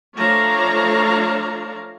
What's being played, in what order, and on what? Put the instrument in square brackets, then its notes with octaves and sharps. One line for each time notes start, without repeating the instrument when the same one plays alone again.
[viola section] F3 A3 D4 C#5 F5 A#5